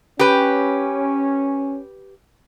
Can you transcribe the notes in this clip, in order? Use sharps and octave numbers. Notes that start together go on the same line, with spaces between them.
C#4 G4 B4